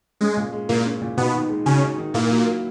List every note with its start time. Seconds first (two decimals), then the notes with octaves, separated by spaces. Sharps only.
0.21 G#3 C#4
0.37 A#2
0.53 G#3
0.69 A#2 A#3 E4
0.85 C#4
1.01 A#2
1.17 B2 B3 D#4
1.34 D#3
1.49 G#3
1.66 C#3 C#4 F#4
1.82 D#4
1.98 D#3
2.14 A#2 A#3 E4
2.31 F#3
2.47 A#3